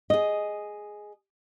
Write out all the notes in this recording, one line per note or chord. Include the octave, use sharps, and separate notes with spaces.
G#4 D#5